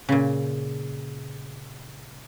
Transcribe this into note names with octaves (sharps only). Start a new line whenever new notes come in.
A#2 C#3